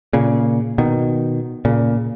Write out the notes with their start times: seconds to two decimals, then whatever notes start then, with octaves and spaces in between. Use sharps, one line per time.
0.13 A#2 C#3
0.78 B2 D#3
1.65 A#2 C#3